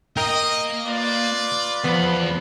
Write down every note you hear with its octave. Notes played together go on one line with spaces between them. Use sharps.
A#3 A#4 D#5 G5
F4 B4 D5
E2 F3 B3 B5